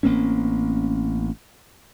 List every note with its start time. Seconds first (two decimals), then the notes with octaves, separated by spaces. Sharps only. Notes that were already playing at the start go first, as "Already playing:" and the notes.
0.03 A1 A#3 C4 C#4